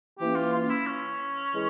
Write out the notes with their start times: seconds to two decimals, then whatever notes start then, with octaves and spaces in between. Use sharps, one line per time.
0.18 E3 A#3 C#4 G4
0.35 F4
0.52 F4
0.70 E4
0.86 C#4
1.54 E3 G#3